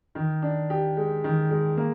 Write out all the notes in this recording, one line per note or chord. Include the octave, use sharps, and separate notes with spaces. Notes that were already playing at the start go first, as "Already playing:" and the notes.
D#3
D4
G4
G#3
D#3
G#3
A#3